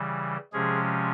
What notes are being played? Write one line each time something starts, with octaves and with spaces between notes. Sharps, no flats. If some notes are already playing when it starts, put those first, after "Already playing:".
Already playing: C#3 E3 G3
C3 F3 G#3 C#4 G#4